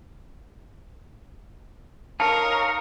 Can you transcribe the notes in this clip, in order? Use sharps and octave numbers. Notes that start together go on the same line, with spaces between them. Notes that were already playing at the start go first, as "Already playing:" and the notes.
D#4 A#4 C#5 D#5 F5 A5